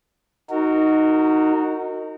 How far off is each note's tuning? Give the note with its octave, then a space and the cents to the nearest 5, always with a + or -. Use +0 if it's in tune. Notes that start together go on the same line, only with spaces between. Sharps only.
D#4 +0 F#4 +0 A#4 -30